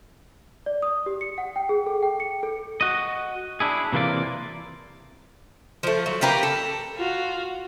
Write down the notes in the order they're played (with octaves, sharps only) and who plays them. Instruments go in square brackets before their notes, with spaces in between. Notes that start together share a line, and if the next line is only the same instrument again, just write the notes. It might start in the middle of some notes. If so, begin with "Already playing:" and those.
[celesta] D5
D#6
G4
C#7
F#5
G5
G#4
A4
G5
C#7
A4
[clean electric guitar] F#4 D#5
D4 E4 G#4
C3 E3 A#3 F4 D5
[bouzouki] F3 A3
F#3
A#3 G4 A#4 B4
A4
[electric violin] F4 F#4